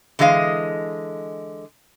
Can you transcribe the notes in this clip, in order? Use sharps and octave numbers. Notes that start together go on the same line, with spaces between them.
D3 E3 G#3 D#5 F5